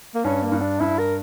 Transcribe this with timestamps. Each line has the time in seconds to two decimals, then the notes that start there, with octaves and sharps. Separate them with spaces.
0.15 A#3
0.24 G2 C#4
0.43 A#3
0.52 G2
0.61 D4
0.80 G2 E4
0.99 A#4